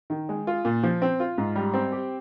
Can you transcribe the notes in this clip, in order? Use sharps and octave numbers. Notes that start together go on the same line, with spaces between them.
D#3
G#3
F4
A#2
F3
C4
F4
G#2
G3
C4
G4